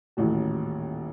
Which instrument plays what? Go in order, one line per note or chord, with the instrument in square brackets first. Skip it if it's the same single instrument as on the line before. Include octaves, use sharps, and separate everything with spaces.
[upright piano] D#1 A1 A2 F#4